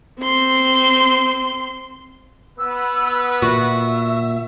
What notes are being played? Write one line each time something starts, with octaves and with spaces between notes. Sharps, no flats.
C4 C6
B3 B4 E6
A#2 F#4 E5